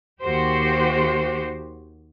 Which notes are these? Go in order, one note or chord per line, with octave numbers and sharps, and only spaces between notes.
D#2 F#4 G4 C5